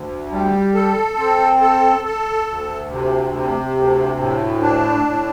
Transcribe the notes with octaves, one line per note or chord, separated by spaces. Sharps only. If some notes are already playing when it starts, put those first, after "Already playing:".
Already playing: D2
G3
A4
C4
A4
A4
D2
C3
C3
D2
A2
D4
A2